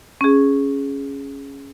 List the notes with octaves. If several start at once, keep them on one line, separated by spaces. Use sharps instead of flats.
C#4 G#4